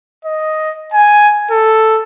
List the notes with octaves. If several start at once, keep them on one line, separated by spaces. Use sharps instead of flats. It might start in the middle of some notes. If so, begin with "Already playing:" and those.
D#5
G#5
A4